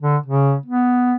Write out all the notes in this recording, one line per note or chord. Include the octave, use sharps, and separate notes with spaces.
D3
C#3
B3